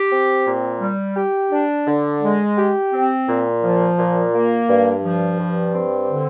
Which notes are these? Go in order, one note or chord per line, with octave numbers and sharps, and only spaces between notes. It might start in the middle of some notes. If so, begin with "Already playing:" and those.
Already playing: G4
C4
A#2
G3
G4
D4
D3
G#3
G4
C4
A#2
F3
A#2
A#3
G2
F3
G2
C4
D3